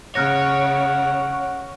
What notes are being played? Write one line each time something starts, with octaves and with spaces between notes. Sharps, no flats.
C#3 C#5 F#5 F6 F#6 A#6